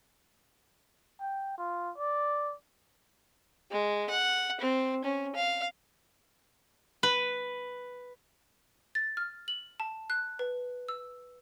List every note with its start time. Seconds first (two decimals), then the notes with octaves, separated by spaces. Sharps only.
1.20 G5
1.58 F4
1.98 D5
3.72 G#3
4.10 F#5
4.61 C4
5.04 C#4
5.36 F5
7.03 B4
8.95 A6
9.17 F6
9.48 F#7
9.80 A5
10.10 F#6
10.39 B4
10.89 E6